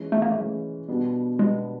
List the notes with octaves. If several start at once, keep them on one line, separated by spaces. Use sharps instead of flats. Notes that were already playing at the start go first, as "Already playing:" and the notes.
Already playing: E3 G#3 C#4
A3
A#3
A3
E3 G#3 C#4
B2 G3 B3 D4
B2 G3 G#3 B3 D4